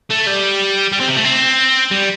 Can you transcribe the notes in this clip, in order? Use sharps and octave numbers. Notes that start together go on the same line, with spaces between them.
A3
G3
G3
C4
C3
A3
C4
G3